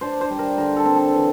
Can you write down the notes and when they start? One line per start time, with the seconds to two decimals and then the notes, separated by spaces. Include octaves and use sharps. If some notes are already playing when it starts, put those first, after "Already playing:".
0.01 D4 C5
0.21 C5
0.30 G3
0.39 A#4
0.58 D3 A#4
0.76 A4
0.85 C4
0.96 A4
1.15 E3